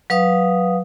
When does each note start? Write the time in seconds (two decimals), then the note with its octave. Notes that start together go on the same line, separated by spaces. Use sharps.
0.10 F#3 B4 F5 D#6